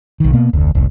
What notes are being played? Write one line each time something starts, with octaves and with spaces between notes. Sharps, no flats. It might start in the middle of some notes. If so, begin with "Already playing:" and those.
B1 D#3
B2 A#3 B3
F1 D2
F1 C2